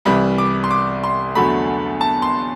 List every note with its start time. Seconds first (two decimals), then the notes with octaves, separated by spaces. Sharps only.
0.05 C2 C3 E3 G3 B5
0.38 D6
0.64 C6
0.71 D6
1.04 C6
1.35 E2 D3 F#3 A3 B5
2.01 A5
2.22 C6